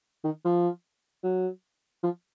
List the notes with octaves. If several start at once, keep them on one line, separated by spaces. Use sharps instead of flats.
D#3
F3
F#3
F3